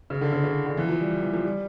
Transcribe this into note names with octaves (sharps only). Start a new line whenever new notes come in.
C#3
D3
C#3
C#3
D3
E3
F3
G3
G3
E3
F3
G3